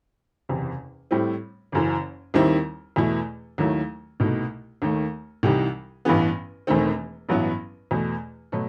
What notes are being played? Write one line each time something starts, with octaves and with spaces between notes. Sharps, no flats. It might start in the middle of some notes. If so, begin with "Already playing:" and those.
F#1 E2 C3
A2 G3 C4 E4
F#1 F#2 E3
D#2 D#3 G3 C4 E4
E2 B2 A3 E4
D#2 D#3 F#3 A3 E4
C2 B2 A3 D#4
D#2 D#3 A3
C2 C3 E3 G3 D#4
A1 G2 E3 B3
E1 E2 D#3 A3 C4
A1 G2 F#3 B3 E4
E2 B2 A3
B2 F#3 A3